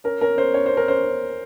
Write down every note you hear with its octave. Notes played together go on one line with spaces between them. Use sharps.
C#4 A#4
C#4 A#4
C#4 C5
C#4 C#5
C#4 C5
A#4
C#4 C5
C#4